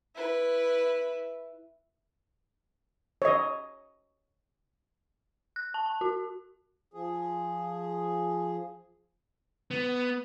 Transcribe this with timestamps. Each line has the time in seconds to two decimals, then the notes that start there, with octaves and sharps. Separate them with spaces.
0.15 E4 B4
3.22 C#5 D#5
5.56 F#6
5.74 A5
5.86 A5
6.01 F#4
6.94 F3 G#4
9.71 B3